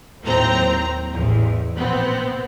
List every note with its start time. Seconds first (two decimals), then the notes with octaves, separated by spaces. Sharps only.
0.23 D#2 A2 F#3 C4 A#5
1.12 A1 E2
1.74 A#1 C3 B3 C4